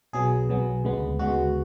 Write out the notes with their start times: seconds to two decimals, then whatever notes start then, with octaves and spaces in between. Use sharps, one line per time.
0.13 B1 B2 F#3 B3 G#4
0.49 B1 B2 F#3 B3
0.84 D2 C#3 G#3 B3
1.19 D2 C#3 G#3 B3 F#4